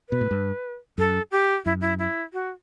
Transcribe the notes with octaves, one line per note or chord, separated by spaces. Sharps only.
B2 B4
A2
G2
F#2 A4
G4
F#2 E4
E4
E4
F#4